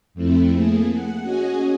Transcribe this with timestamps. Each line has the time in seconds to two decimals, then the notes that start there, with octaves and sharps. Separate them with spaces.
0.14 F2 A3 C4 E4
0.51 A3 A#3 G#4
0.92 F#5
1.22 C#4 F#4 G#4 D#5 G#5